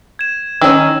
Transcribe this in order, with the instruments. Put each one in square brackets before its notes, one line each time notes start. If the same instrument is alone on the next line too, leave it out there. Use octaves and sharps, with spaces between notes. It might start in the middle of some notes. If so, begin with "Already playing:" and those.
[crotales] G#6 E7
[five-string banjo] D#3 C#4 [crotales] E6